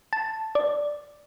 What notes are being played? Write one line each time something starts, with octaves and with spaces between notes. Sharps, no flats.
A5
D5